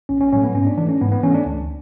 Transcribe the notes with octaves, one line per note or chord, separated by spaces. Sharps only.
A1 C#4
C#4
A2 F#3 A3 C#4
B3
G#2 C#4
D4
E3 A3 D4
C#4
G#2 B3
B3
E3 A3 C#4
D4
D2